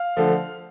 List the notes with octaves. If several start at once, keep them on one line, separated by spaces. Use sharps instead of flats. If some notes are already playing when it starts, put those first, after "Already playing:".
Already playing: F5
D3 F3 A3